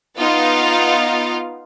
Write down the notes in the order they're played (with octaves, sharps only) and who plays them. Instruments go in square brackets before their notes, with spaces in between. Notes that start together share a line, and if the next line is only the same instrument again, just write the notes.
[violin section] B3 D#4 F4 F5 A6